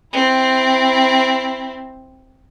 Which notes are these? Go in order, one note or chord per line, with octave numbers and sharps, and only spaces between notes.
C4 E4